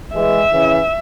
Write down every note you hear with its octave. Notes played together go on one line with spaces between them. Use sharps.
E3 G#3 E5
C#3 E3